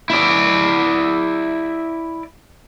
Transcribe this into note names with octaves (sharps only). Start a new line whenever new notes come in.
E4 D5